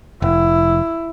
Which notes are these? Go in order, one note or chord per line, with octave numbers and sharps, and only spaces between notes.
F1 E4